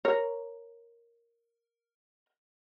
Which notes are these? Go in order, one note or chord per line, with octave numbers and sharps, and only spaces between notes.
A#4 C#5